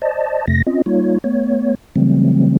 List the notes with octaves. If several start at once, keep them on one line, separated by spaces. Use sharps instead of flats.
C5 D5 D#5 A5
F2 C3 A3 A#6
C4 C#4 F4 D#5
G3 A#3 D#4 F4 C#5
A3 B3 C#5
C#3 E3 F#3 G3 A3 C4